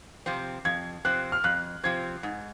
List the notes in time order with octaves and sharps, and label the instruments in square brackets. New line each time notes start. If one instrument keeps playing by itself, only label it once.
[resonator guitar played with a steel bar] C3 F3 C4
[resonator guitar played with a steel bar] F2 [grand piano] G#6
[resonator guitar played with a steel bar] C3 F3 C4 [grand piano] F#6
[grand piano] F6
[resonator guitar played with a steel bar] F2 [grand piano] F#6
[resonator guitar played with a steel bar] C3 F3 C4 [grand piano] G#6
[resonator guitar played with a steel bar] G#2